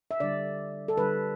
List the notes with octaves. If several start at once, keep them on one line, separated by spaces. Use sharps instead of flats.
E5
D3 G3 D5
A4
D3 G3 B4